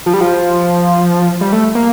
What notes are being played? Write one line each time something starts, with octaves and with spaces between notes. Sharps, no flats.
F3
G3
F3
G3
A3
A#3